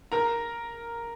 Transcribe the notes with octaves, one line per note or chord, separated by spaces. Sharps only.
A#4 A#5